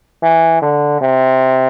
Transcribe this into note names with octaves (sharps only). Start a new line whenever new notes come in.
E3
D3
C3